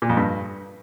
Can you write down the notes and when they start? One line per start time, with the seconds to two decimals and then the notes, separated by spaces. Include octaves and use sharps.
0.02 A#2
0.09 F2
0.17 G2